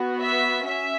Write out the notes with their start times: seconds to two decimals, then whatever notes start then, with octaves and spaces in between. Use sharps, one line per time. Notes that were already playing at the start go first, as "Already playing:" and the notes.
Already playing: B3 F#4
0.20 E5
0.66 C#4 E5